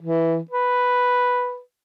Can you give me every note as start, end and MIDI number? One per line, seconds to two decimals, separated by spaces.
0.01 0.38 52
0.51 1.60 71